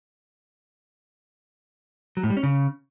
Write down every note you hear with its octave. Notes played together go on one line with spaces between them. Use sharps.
F#3
A2
G3
C#4
C#3